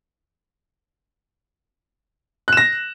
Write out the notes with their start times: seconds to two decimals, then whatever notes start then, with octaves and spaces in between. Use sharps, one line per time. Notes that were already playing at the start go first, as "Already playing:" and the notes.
2.48 F#6
2.53 E7
2.57 A#6